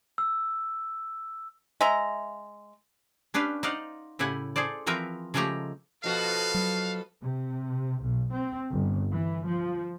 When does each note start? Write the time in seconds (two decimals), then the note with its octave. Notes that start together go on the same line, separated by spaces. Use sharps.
0.18 E6
1.81 G#3 E5 A#5
3.34 C#4 D4 G4 B4 F5
3.63 D#4 C5 D5 D#5 F5 F#5
4.19 A2 C#3 E4 G4 F#5 G#5
4.56 G#4 A4 C5 D5
4.86 E3 F3 C4 A#4 B4 E5
5.34 C#3 F3 G#3 A3 G4 A#5
6.04 B2 F3 F#4 A4 B4 F5
6.54 F#3
7.21 C3
8.01 B1
8.32 C4
8.71 G1
9.12 E3
9.45 F3